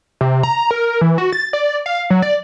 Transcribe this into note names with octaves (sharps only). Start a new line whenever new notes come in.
C3
A#5
A#4
E3
F#4
A6
D5
F5
F#3
D5